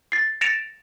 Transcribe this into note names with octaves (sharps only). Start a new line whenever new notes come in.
A6 C7
A6 A#6 C#7 D7 E7 F7